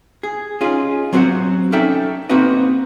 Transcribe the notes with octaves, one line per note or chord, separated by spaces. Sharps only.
G#4
C#4 D#4 F4 G#4
F#3 C4 F#4 B4 C5 F#5
C#4 D#4 A4 D5 E5 G5
A#3 C4 D#4 F#4 B4 D#5